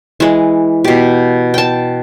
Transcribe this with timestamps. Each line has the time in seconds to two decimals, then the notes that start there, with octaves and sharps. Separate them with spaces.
0.20 E3 G#3
0.84 B2 G4
1.54 G5 A5